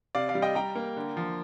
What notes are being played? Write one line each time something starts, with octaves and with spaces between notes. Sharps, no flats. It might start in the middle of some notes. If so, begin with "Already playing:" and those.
C3 D5 F5
D5 F5
G3
D#5 G5
G3 G5 A#5
A#3
D3
F3